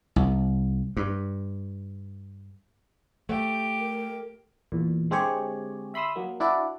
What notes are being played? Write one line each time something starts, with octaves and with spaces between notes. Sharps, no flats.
C2
G2
A3 G4
A#4
E2 A#2
D3 G#3 C4 G4 G#4 C#5
E5 B5 C6 D#6 E6
F#3 A#3
D4 E4 F#4 D5